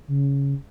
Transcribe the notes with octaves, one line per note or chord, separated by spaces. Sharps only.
C#3